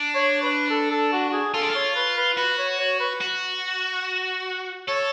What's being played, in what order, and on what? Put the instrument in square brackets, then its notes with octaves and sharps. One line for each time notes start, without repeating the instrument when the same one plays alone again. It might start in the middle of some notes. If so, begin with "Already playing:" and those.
Already playing: [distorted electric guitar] D4
[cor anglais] C#5
B4
A4
A4
F#4
F#4
G#4
[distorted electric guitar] F4 [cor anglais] A4
[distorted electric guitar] D4
F4
[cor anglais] C#5
B4
B4
[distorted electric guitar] F#4 [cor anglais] B4
[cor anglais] C#5
C#5
B4
[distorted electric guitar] F#4
[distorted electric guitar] A4 [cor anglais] C#5